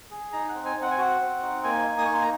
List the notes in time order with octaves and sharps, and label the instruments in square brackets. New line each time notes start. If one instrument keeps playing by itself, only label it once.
[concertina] G#4
D#4 A#5
F#5
C4
G#5
C4
F#5
G#5
F#4 F#5
C4
D#4
A#3 G#5
D#4
D#6
A#3 C#6
C6
A#5